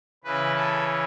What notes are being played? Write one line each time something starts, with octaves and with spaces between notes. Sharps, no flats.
C#3 E3 C#4 B4
A4